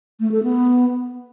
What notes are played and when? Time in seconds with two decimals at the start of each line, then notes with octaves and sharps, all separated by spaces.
0.20 A3
0.32 A4
0.43 B3